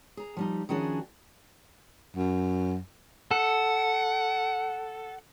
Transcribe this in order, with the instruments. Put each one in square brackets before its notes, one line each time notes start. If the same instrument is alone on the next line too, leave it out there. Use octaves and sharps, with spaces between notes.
[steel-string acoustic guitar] G#4 A#5
F3 G3 D#4
D#3 F3 C#4 D4 F#4 G#4
[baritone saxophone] F#2
[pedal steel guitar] A4 [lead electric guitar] F#5